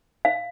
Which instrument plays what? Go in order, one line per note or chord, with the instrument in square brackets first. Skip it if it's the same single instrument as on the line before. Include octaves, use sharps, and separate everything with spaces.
[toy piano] F5